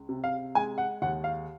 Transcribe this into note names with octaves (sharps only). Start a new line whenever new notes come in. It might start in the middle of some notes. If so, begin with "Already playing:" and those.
Already playing: C#2
C3
F5
G#3 G#5
F#5
D#2 F#5
F5